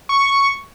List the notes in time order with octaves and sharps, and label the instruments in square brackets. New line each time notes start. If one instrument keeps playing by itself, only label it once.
[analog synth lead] C#6